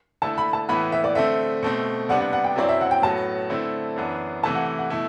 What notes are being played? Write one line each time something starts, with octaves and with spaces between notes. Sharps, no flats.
D3 A3 E4 A5
B5
A5
A2 E3 B3 E4 B5
E5
D5
D3 A3 C4 E5
B2 A3 C4
C3 G3 B3 D4 F#5
F#5
F#5
G5
F#2 F#3 C4 E4 D5
E5
F#5
G5
A2 F#3 B3 A5
D3 A3 C4 E4
F#2 E3 B3 D4
C3 E3 A3 E4 A5
F#5
F#5
B2 A3 E4